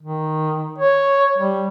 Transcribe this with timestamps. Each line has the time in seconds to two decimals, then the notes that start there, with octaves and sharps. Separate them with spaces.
0.03 D#3
0.78 C#5
1.38 G3